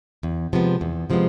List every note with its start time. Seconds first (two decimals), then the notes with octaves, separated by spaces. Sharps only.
0.23 E2
0.53 C3 F3 G#3 B3
0.81 E2
1.10 C3 F3 G#3 B3